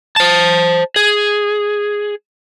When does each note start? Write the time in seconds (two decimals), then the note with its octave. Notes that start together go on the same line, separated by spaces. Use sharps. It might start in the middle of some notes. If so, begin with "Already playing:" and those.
0.16 C5 A5
0.96 G#4